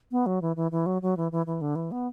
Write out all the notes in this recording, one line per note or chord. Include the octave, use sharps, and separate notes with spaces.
B3
F#3
E3
E3
E3
F#3
F#3
E3
E3
E3
D3
E3
B3